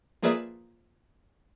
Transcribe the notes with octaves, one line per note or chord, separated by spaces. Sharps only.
F3 A#3 G#4 B4 D5 E5